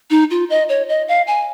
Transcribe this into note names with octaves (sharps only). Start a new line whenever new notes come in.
D#4
F4
D#5
C#5
D#5
F5
G#5